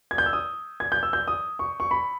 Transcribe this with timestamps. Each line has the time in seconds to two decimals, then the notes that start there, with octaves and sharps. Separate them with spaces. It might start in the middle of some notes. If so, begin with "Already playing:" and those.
0.11 G#6
0.18 G6
0.26 E6
0.33 D#6
0.80 G#6
0.92 G6
1.03 E6
1.13 G6
1.28 D#6
1.59 C#6
1.80 C#6
1.91 B5